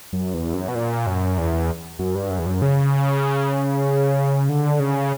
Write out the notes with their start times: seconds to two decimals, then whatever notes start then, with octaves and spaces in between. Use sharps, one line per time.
0.13 F#2
0.34 E2
0.54 F#2
0.68 B2
0.75 A#2
1.07 F#2
1.38 E2
1.99 F#2
2.15 G2
2.30 F#2
2.39 E2
2.46 F#2
2.62 C#3
4.49 D3
4.80 C#3